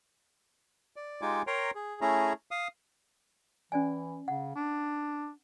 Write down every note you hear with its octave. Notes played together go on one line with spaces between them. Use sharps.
D5
G#3 D#4 F4 G4 G#5 D6
A#4 C#5 G5 A#5 C6
G#4
A3 C#4 E4 G#4 A#5
F5 D#6
E3 C#4 D5 G#5
C#3 F#5
D4